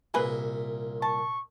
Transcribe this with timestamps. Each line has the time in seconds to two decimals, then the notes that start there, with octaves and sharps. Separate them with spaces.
0.14 C2 A#2 G#4 B4
1.02 A5 C#6